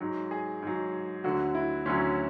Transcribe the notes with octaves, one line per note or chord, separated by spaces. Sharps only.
G#2 F#3
G#4
G#2 F#3
D2 D3 F#3 F#4
E4
D2 D3 F#3 C#4